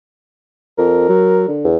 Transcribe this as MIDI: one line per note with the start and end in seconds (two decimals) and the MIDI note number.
0.78 1.05 41
0.78 1.52 70
1.09 1.44 54
1.48 1.68 50
1.65 1.77 40